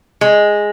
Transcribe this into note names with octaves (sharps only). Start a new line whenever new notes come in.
G#3